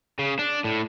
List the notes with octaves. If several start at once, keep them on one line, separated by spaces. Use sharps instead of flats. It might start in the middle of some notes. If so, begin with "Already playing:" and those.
C#3
D4
A2